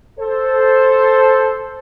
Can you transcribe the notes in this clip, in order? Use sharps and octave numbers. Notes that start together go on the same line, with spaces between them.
A4 C5